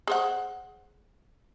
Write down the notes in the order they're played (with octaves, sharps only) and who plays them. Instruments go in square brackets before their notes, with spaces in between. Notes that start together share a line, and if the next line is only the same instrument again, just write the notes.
[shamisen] G#4 C5 F#5